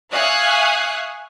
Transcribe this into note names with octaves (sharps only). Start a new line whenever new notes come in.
E5 F5 G#5 C#6 D#6 F#6